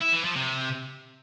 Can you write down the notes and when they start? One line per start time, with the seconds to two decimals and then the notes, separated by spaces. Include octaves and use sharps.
0.01 E4
0.13 E3
0.24 F3
0.36 C3